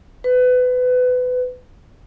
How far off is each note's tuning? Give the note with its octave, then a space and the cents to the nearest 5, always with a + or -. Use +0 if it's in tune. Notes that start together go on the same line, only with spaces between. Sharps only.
B4 +25